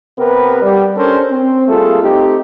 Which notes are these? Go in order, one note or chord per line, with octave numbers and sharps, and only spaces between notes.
C3 B3 G4 A#4 B4
G3
C#4 D4 A4 A#4 C5
C4
G3 A3 A#3 F4 G#4 A4
A3 C4 D#4 G4